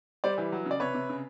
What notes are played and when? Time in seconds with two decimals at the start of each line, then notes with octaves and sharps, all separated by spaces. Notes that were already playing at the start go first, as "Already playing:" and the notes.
0.24 G3 C5 D5
0.38 E3
0.52 F#3
0.66 C#3
0.71 D5
0.80 C3 B4 C#5
0.94 C3
1.09 C#3